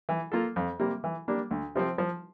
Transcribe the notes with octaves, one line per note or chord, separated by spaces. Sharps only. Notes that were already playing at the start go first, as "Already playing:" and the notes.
E3
A#3 F4 A4
F2
C3 G3 A#3
E3
G3 A#3 D4
D2
C3 F3 C4
F3